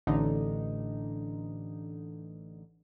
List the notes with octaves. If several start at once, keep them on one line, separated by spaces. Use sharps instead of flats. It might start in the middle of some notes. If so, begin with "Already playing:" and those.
A1 D3 D#4